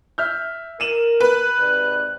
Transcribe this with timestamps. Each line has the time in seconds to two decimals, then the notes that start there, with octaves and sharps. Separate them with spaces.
0.18 E5 F6 G6
0.80 A#4 D#7 E7 F#7
1.20 B4 F#6
1.58 G#2 C3 D5